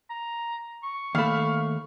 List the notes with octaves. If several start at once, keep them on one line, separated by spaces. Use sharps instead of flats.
A#5
C#6
D#2 A3 F5 B5